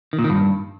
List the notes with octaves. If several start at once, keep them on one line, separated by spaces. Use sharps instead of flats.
D#3
A#2
D#3
G2